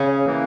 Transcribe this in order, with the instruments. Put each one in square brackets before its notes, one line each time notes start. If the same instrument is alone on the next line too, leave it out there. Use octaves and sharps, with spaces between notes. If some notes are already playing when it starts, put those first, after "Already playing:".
Already playing: [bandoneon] C#3 [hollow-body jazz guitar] C#4
[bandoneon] E3 A#3